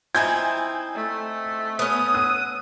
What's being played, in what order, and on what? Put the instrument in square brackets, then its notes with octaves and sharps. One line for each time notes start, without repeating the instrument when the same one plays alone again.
[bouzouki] C4 D#4 E4 [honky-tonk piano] G#5 G6 G#6
[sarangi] A3
[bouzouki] B3 C#4 [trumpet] D#6
[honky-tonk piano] E6 F#6 D#7